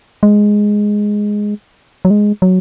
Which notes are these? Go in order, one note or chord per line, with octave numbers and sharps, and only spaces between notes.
G#3
F#3
G#3
F#3